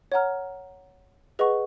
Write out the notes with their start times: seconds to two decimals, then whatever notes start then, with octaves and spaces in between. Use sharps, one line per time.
0.12 C#5 F#5 A#5 F6
1.39 G#4 B4 D#5 F#5 C#6